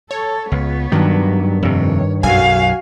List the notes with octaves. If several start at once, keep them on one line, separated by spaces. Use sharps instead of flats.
A4 C#5
C#2 B3
G2 D#3 F#3
F2 C3 C#5
B1 F#2 F#4 F5 G#5